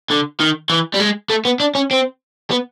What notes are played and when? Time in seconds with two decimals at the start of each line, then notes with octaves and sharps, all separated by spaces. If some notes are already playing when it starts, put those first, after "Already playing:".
0.10 D3
0.40 D#3
0.70 E3
0.94 G3
1.00 G#3
1.30 A3
1.45 B3
1.60 D4
1.75 C#4
1.91 C4
2.50 B3